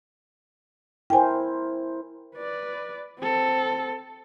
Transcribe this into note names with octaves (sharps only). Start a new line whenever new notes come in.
E4 A#4 C5 G5 G#5
B4 D5
C4 A4